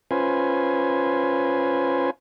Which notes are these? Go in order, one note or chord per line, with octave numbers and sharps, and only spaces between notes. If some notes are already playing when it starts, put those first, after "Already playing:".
C#4 F4 B4 C5 G#5